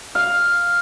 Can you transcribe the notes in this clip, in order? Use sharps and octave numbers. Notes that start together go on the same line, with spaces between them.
F5